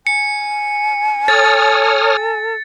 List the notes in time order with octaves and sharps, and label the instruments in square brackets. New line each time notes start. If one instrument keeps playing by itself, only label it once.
[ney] G#5 [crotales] C#7
[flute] A4 [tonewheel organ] C#5 D#6 F6 [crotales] A6